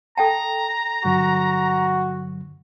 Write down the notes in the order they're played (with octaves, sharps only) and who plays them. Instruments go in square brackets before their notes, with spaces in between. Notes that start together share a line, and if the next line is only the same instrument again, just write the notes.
[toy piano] A4 G5 A5 [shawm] A#5
[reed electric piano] G2 D3 F#3 [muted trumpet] F#4